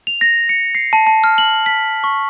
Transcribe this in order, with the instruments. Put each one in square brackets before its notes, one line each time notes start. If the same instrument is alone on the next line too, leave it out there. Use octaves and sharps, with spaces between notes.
[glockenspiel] F7
A#6
C#7
C7
A5
A5
F6
F#7
B6
C#6